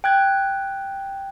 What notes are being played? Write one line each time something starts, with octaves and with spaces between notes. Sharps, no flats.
G5 F#6 G#6